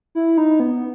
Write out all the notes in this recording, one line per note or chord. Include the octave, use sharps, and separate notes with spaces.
E4
D#4
B3